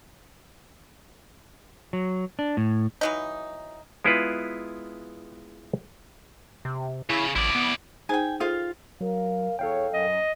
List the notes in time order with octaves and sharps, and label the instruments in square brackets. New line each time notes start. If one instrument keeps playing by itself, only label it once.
[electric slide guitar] F#3
D4
A2
[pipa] E3 F#3 D#4
[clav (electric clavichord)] G#3 B3 E4 F4 G#4 B4
[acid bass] C3
[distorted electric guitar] C#3 [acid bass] E4
[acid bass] A1 [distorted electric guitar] E4 D5
[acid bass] B3
[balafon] D#4 G#4 C5 [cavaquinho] G5 G#5
[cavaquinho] F4 F5 [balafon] G#4 A4 C5
[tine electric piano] F#3 [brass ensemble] A#4 F5
[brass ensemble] E2 C#5 [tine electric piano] A4 F5 G5
[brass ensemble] F#2 [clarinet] D#5